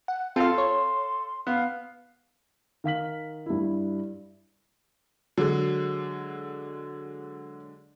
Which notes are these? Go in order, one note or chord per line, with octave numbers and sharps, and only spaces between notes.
F#5
C4 F4 A4 F5 C6
C#5
B3 F5
D#3 F5 B6 F#7
G2 E4
D3 F#3 G#3